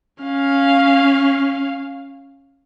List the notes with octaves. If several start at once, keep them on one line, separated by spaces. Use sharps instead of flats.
C#4 F5